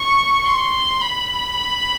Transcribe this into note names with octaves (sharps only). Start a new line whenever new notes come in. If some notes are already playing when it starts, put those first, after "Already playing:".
Already playing: C#6
C6
B5